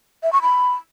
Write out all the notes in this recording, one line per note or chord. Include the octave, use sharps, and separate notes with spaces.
E5
C#6
B5